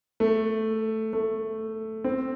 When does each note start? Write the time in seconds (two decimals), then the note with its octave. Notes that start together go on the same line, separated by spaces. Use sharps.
0.20 A3
1.13 A3
2.04 C4